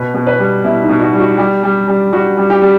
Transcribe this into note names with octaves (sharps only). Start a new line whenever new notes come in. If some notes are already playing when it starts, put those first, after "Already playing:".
Already playing: B2 B4
B2
B4
G3
B2 E4
D#4
B2
F#4
G3
F#4
G3 G4
G3
G3
G3 F#4
G3
G4
G3